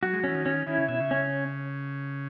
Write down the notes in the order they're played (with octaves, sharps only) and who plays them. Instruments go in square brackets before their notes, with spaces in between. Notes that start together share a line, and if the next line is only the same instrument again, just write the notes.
[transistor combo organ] F#3 [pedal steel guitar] F#4
[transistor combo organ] G#3
F#3
[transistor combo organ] E3 [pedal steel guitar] C#4
[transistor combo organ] D#3
[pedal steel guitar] C#4
[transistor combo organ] D#3 [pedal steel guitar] E4
[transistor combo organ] C#3
[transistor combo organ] B2 [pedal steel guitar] E5
[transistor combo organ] C#3
[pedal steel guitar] C#4